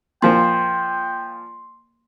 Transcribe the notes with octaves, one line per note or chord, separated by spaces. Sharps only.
A#2 F3 A#3 A#4 C5 G5 C6